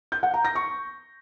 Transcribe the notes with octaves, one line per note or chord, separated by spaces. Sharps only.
G6
F#5
A#5
A#6
C#6